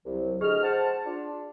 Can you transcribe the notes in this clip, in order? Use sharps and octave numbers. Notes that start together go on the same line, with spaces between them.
C2 F#3
D2 G#4 D#5 F6
C5 F#5 A5
D4 F4